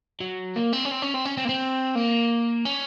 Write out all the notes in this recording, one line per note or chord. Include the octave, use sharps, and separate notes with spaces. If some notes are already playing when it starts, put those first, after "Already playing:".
F#3
A#3
C4
C#4
C4
C#4
C4
C#4
C4
A#3
C4
A#3
C#4